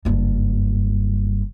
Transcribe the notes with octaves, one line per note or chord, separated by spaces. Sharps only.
F#1 G2